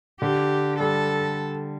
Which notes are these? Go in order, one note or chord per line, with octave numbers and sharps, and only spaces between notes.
D3 G4
G3 A4